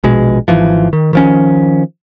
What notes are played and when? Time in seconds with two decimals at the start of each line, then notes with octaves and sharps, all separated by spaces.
0.04 A#1 B2 G#3
0.48 G#1 E3 F3
0.93 D#3
1.13 D#3 F3 C#4